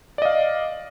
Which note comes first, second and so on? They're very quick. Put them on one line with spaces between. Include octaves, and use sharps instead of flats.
D5 D#5 F5